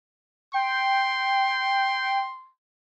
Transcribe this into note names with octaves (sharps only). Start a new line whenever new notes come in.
G5 C6